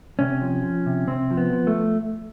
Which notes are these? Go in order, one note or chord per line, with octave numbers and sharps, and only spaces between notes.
C3 C#4
F3
F3
C3
C3 C4
F3
B3
F3
A3